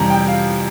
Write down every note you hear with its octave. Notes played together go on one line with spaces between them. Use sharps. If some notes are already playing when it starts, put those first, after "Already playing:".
Already playing: F2 C3 E3 G3 A#5
G5
F5